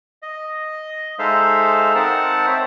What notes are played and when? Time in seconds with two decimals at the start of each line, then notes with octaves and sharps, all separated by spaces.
0.22 D#5
1.19 G#3 D#4 A4 C5 E5 F5
1.95 C4 D#4 A#4 F#5 A5
2.47 C5 C#5 E5